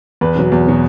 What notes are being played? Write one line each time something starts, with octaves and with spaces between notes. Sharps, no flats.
E2 B4
B2 F#3
E2
B2 F#3